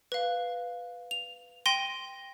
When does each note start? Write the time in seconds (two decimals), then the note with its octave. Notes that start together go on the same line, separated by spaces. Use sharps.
0.12 B4 F5
1.11 F7
1.66 G5 C6 A#6 D#7 G7